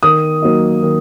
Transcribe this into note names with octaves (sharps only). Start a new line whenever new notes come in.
D#3 D#6
F#3 A#3 D#4
D#3